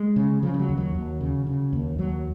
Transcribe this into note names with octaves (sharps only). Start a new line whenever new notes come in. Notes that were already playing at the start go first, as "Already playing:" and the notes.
Already playing: G#3
C#3
C#3 F3
F3
F#3
D#2
F#3
D#2
C#3
C#3
D#2
D#2 F#3